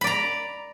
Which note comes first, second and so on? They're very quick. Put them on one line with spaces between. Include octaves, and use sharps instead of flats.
B5 D5 A#5